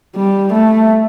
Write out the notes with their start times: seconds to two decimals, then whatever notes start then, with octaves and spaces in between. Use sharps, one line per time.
0.16 G3
0.52 A3